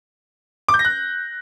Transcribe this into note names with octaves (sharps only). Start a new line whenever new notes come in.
D6
G6
A#6
F#6